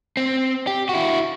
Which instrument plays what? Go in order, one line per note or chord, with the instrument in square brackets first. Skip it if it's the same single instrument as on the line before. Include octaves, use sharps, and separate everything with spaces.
[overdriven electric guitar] C4
G4
E4 F#4